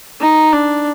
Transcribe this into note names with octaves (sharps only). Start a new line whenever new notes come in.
D#4
D4